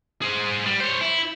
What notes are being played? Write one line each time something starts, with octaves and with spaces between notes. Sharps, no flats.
G#4 C5
G3
C5 C#5
E4